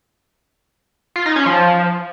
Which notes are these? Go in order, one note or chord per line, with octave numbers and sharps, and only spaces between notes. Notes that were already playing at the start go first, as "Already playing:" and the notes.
F4
D#4
C#4
F3